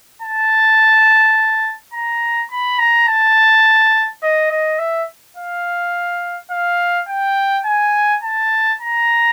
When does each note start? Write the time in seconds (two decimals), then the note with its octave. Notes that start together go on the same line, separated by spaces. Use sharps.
0.22 A5
1.93 A#5
2.51 B5
2.79 A#5
3.08 A5
4.23 D#5
4.51 D#5
4.79 E5
5.37 F5
6.51 F5
7.08 G5
7.66 G#5
8.23 A5
8.81 A#5